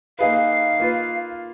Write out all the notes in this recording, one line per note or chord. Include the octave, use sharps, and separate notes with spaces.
A#3 D#4 G#4 B4 F5
A#3 F4 B4